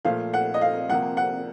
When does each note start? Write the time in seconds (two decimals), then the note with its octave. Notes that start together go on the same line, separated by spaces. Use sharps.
0.05 A#2 F3 A3 F5
0.34 F#5
0.54 D#5
0.61 F5
0.89 C2 C3 F3 A#3 F#5
1.17 F#5